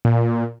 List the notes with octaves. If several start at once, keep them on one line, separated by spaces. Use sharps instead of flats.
A#2